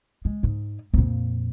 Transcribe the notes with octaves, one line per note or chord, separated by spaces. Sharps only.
G#3
G#2
F2 A#2